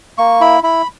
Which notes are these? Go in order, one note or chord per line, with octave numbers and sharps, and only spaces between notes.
A#3 C#6
E4 B5
E4 B5